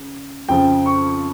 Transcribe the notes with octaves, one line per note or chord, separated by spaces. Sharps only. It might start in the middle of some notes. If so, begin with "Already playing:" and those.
Already playing: C#3
F2 C#3 F3 G5
C#6